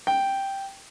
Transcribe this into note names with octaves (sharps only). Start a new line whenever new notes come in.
G5